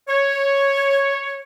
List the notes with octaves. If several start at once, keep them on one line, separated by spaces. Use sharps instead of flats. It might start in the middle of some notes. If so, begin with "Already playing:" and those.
C#5